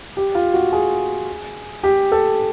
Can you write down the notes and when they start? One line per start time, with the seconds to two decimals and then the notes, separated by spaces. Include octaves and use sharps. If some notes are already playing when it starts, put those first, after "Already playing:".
0.17 G4
0.35 F4
0.54 F#4
0.73 G#4
1.83 G4
2.12 A4